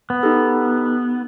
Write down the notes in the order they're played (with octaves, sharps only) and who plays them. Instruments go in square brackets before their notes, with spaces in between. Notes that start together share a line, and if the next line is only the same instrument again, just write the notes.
[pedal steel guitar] B3
[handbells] D#4 G4 A4